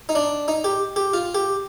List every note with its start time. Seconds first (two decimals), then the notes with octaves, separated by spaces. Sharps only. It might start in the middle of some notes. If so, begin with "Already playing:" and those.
0.09 D#4
0.15 D4
0.48 D#4
0.64 G4
0.96 G4
1.14 F4
1.35 G4